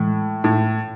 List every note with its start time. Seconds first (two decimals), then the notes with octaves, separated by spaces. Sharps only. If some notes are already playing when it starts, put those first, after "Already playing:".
Already playing: A2 E3 G#3
0.44 A2